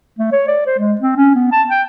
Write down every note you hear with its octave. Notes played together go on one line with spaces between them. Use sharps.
A3
C#5
D5
C5
G#3
C4
C#4
B3
A5
G5